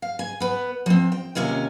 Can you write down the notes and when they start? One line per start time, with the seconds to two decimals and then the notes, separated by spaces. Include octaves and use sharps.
0.02 F5
0.19 G#5
0.40 B3 B4
0.86 F3 C4
1.12 G5
1.35 D#2 C3 C#4 F4 G#5